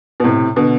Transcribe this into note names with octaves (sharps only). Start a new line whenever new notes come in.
B2
A2 C3
B2 D3